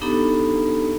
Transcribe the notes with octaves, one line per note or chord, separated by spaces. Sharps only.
B3 D4 D#4 G4 A4 A#5